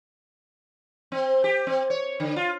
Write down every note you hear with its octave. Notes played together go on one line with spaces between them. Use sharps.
C4
G4
C4
C#5
D3
F4